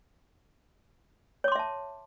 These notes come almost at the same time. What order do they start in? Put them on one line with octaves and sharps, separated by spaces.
C#5 D6 C6 E5 A5